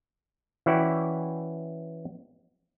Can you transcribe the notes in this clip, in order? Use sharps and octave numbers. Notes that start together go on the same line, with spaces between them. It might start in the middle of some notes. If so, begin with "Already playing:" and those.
E3 C#4 E4 F#4 D5 G5